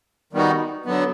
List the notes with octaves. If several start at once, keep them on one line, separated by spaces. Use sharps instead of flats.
D#3 G3 B3 D#4 F#4
D3 F#3 B3